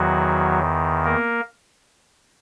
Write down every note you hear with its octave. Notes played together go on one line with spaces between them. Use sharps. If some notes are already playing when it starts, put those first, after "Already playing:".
Already playing: E2 D#3 F#3 F#4
A#3 A#4